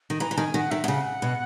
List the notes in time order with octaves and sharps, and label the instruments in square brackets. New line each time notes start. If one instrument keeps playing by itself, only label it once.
[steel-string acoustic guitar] D#3
[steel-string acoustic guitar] E3 [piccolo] A#5
[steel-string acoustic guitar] E3
[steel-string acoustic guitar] D#3 [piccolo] G#5
[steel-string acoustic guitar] D#3 [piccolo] F#5
[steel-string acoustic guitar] D#3 [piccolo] E5
[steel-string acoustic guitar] B2
[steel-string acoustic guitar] C#3 [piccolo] F#5
[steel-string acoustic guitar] B2